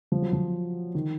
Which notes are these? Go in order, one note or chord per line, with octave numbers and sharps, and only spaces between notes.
F3
F#3
F3
D#3